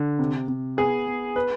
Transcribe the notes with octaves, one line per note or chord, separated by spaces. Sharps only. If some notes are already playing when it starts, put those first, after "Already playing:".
Already playing: D3
C3
C3
B3 G#4
B3
B4